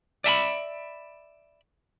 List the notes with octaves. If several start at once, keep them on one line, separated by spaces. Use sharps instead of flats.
D5 E5 A5 B5